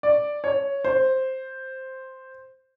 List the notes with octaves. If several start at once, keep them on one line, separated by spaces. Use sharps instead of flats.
D5
C#5
C5